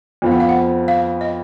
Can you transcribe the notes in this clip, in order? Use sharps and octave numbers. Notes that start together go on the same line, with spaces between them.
F2 F3 B3 F4
F#5
F5
F#5
F5
D#5